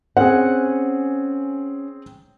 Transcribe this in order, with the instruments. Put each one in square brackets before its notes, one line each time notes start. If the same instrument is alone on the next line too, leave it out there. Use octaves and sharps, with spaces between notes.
[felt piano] C4 G#4 [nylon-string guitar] C#4 F#5